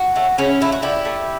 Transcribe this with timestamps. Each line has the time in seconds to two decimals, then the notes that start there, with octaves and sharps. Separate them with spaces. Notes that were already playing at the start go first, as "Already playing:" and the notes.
Already playing: F#4
0.16 F#3 A3
0.38 C#3 C#4 E4
0.61 F#3 A3 E4
0.72 F#4
0.82 D3 E4 G4
1.05 A3